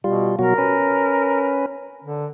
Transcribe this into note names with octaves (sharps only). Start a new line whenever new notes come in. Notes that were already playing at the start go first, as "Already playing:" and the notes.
B2 G3 F4
B2 F#3 F#4 A#4
C#4 B4
D3